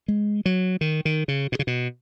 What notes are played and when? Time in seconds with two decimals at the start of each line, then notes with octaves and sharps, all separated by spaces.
0.08 G#3
0.46 F#3
0.81 D#3
1.05 D#3
1.28 C#3
1.52 B2
1.59 C#3
1.67 B2